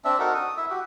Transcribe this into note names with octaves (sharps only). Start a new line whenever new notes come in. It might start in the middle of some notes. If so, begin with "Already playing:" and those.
C4 D4 E5
D#4 F#4 A4 A#4
D#6
E4 E5
F#4 G4